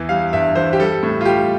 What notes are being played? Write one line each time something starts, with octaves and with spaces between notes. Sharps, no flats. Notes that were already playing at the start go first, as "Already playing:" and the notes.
Already playing: E2 E3
G3 F5
G2 E5
E3 C5
G4
G3 A4
A2
F4
G3 G4